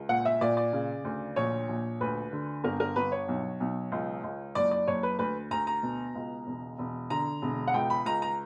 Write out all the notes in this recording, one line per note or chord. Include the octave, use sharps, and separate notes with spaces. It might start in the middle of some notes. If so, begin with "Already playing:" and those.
Already playing: C#2
A#2 F#5
E5
A#2 D5
D5
C#3
D2
A#1 C#5
A#1
D2 B4
D3
G1 A#4
A#4
G1 B4
C#5
B1
B1
C#2
C#2
F#1 D5
D5
F#1 C#5
B4
D2 B4
D2 A#5
A#5
B2
C#2
E1
E1
D3 A#5
E1
F#5
C#2 G5
B5
C#2 A#5
A#5